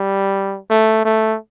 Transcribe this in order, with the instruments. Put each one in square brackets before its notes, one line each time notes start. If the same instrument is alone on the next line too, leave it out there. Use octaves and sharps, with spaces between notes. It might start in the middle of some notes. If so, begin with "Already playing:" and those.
Already playing: [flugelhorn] G3
A3
A3